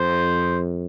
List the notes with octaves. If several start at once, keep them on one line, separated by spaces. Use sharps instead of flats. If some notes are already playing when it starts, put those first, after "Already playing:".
Already playing: F2 C5